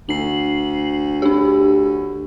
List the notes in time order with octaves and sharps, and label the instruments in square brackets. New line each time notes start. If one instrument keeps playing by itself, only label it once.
[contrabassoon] D2 [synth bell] C7 F#7
[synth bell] D4 G4